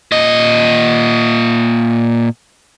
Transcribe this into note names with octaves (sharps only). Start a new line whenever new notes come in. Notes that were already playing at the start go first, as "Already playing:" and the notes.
A#2 D#5